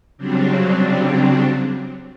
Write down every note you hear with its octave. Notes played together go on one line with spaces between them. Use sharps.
C#3 F#3 G3 C4 D4